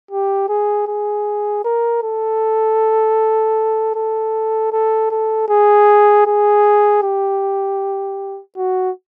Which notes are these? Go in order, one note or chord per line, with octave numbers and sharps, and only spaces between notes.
G4
G#4
G#4
A#4
A4
A4
A4
A4
G#4
G#4
G4
F#4